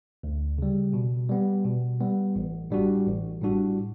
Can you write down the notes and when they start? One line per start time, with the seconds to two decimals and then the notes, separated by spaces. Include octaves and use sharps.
0.23 D2
0.58 C#3 G3
0.93 B2
1.30 G3 B3
1.65 B2
2.01 G3 B3
2.36 A1
2.70 A2 G3 D4 F#4
3.06 A1
3.41 A2 G3 D4 F#4